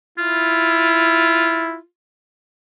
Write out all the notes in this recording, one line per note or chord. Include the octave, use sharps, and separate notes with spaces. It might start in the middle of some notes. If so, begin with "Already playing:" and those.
E4 F4